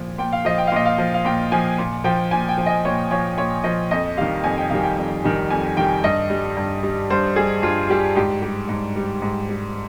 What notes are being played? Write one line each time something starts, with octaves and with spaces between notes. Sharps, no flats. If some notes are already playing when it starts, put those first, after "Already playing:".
Already playing: A#2 F3
A#2 G5
F5
F3 D#5
G5
F5
A#2 D#5
F5
F3
F5
A#2 G5
F3 G#5
A#2
F3 G5
A#2 G#5
G5
F3
D#5
A#2 C#5
F3 C#5
A#2 C#5
F3 D#5
F2 D#5
D#3 G3 F5
F2 G#5
G5
D#3 G3 F5
G5
F2
D#3 G3
F2 G#5
D#3 G3 G5
G2 D#5
G3
G2
G3
G2 C5
G3 G#4
G2 F4
G3 G4
G#2 G4
G3 G4
G#2
G3
G#2
G3